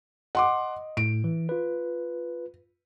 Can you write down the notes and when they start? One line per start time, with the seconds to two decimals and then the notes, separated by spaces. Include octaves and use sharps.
0.35 D#5 F#5 C6 D6
0.97 A2 D7
1.24 E3
1.49 F4 B4